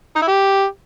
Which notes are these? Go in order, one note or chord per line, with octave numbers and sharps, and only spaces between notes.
D#4
E4
G4